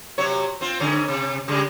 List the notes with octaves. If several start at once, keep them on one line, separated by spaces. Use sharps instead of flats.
C3 F#3 C#5
C4 F4
G#2 D3 C#4
C3
C#3 G3 G#3